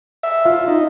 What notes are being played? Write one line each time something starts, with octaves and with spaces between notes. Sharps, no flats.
E5
F4
D#4